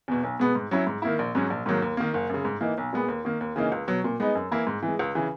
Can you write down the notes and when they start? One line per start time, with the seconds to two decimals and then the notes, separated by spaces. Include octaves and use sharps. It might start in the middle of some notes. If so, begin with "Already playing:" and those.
0.08 E2 B2
0.23 B1
0.39 B2 G#3 B3
0.55 G#2
0.71 F#3 C#4 E4
0.87 G#2
1.02 D#3 A#3 E4
1.19 A#1
1.35 G#2 F#3 C#4
1.50 A#1
1.66 G#2 D#3 F#3 A#3
1.82 D#2
1.97 D#3 A#3
2.14 F#1
2.29 F#2 C#3
2.45 G#2
2.61 E3 A#3 D#4
2.78 B1
2.93 A#2 G#3 B3
3.08 D#2
3.25 D#3 A#3
3.41 D#2
3.56 C#3 E3 A#3 D#4
3.72 C#2
3.87 B2 F#3
4.04 A#2
4.20 G#3 B3 D#4
4.35 F#2
4.51 E3 A#3 E4
4.67 G#2
4.83 E3
4.88 G#3
4.99 C#2
5.15 C#3 E3